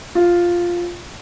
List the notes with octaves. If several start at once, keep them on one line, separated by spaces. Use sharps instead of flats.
F4